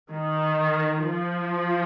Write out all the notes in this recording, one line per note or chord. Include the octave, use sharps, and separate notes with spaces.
D#3
F3